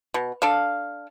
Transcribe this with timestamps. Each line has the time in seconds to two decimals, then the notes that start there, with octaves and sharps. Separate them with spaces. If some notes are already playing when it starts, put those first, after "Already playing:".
0.14 B2
0.42 D4 A4 F5